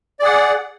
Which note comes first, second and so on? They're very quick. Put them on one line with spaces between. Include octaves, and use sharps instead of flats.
D5 G#4 F#5